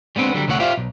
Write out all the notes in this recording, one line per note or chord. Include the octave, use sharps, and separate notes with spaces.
G3 G#3 B3 C4 D4
D3 F#3 G3
D2 C3 A3 E4 C#5 F#5
F4 G4 C5 D5 E5 F5
B1